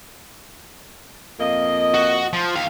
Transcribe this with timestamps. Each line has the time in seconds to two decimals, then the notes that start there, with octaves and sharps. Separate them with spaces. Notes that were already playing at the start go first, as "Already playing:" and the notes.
1.39 F2 A#3 D#5
1.94 F#4
2.33 F3
2.55 D#2 F5